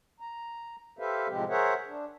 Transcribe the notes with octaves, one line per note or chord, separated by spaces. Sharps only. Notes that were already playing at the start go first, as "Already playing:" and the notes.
A#5
G4 A4 B4 C5 E5 F5
A2 C3 F3 G#3 C4 G4
G#4 A#4 C5 C#5 E5 F#5
D4